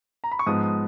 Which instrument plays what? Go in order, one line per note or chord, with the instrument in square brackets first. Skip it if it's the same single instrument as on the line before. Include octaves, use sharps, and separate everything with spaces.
[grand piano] A#5
B5
C#6
G#2 F3 G#3 B3 D#4 D#6
D#6